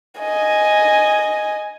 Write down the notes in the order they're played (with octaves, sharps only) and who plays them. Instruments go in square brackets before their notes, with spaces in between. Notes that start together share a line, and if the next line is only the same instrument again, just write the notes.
[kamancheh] D#5 G#5